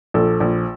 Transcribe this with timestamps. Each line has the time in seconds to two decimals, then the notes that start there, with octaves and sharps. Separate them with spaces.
0.14 A#1 A4
0.40 A#1